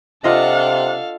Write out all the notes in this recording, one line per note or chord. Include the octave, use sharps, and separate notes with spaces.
C3 D4 F4 A4 D#5 F5 F#5